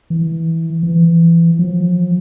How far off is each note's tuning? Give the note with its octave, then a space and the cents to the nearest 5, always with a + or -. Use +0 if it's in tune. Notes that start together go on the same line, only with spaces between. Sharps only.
E3 -10
E3 +25
F3 +40